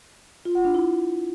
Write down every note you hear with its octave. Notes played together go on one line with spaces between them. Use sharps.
F4
F#5
D4
E4